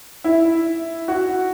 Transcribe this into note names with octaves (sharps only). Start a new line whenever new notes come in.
E4
F#4